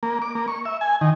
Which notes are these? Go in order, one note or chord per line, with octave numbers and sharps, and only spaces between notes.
A#3
D6
A#3
C#6
E5
G#5
D#3